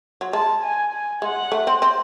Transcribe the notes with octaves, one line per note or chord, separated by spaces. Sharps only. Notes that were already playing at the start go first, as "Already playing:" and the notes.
F#3
G#3 A5
G#5
G#5
G#3 F#5
A3
C4
C4